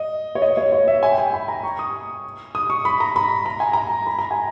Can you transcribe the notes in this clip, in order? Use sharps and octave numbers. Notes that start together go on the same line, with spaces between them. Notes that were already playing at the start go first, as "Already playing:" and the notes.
Already playing: D#5
C#5
D#5
C#5
C#5
E5
G#5
G5
G#5
B5
A#5
C#6
D#6
D#6
C#6
B5
A#5
B5
A#5
G#5
A#5
B5
A#5
G#5